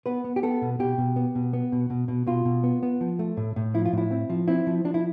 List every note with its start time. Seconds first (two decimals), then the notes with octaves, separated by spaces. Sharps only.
0.06 B3 B4
0.24 B3
0.36 G4
0.43 B3 A4
0.62 B2
0.79 B2 G4
0.98 B2
1.16 B3
1.35 B2
1.53 B3
1.72 B2
1.90 B2
2.08 B2
2.27 B2 F4
2.45 B2
2.64 B3
2.83 B3
3.01 F3
3.19 A3
3.37 A2
3.56 A2
3.74 F3 E4
3.86 F4
3.93 A2 E4
4.11 C4
4.30 F3
4.48 C4 E4
4.67 F3
4.85 F3 D4
4.94 E4